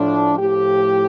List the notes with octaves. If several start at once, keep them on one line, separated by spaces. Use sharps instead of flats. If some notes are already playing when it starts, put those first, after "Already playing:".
Already playing: A2 F3 D4
A2 F3 G4